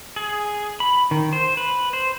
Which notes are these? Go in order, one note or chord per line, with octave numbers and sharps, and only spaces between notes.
G#4
B5
D#3
C5
B4
C5